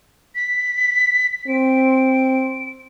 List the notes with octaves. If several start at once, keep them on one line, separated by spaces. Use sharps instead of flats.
B6
C4 D7